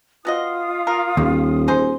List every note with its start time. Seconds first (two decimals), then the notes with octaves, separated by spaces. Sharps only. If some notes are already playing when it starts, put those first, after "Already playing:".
0.25 B3 F4 F#4 D#5 D#6
0.87 A#4
1.17 D#1 D#2 A#3
1.68 D#4 G#4 C5